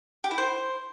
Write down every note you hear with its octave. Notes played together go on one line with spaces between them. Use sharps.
G4
E4
C5